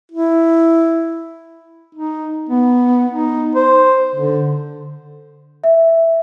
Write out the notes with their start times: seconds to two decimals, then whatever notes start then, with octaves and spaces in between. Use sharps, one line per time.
0.11 E4
1.95 D#4
2.49 B3
3.10 D#4
3.55 C5
4.15 D3
5.64 E5